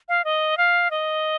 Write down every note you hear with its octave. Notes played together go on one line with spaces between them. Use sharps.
F5
D#5
F5
D#5